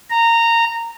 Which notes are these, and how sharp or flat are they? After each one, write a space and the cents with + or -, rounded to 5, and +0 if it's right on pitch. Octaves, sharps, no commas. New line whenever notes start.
A#5 -15